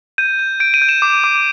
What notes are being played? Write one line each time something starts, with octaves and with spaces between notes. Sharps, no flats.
G6 D#7
G6
G6 D7
D#7
G6
E7
D6
D6